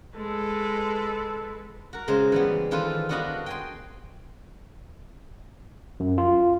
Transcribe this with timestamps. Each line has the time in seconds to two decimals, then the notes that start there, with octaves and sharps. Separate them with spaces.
0.15 G#3 A4 B4
1.93 F#4 A#4
2.07 A#2 C#3 G#3 C5
2.32 E3 G3 B3
2.71 D#3 E3 F4 A4 B4 C5
3.09 B3 D4 F#4 D#5 F5 B5
3.46 G5 G#5 C6
6.00 F#2
6.18 F4